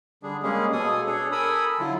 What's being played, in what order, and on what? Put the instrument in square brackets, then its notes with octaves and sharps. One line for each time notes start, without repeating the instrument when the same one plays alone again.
[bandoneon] D3 G3 D4 G#4
G3 G#3 A#3 C#4 G#4
B2 G#4 A4 G#5 D#6
D4 G#4 A4 C#5
A4 A#4 G#5 B5 D#6 E6
D3 F#3 E4 F4